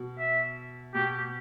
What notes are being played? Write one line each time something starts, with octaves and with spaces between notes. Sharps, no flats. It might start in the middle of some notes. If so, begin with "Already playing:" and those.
Already playing: B2
E5
B2 G4